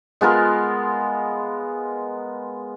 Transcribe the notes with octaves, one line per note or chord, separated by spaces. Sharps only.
G#3 B3 F4 A#4